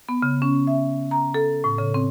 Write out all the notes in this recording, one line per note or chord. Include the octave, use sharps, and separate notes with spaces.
B3
C#3
C#4
E5
A#5
A4
A2
C#3
C4